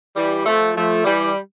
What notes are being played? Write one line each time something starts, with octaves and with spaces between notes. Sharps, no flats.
E3 G3
F3 A3
F3 A3
E3 G3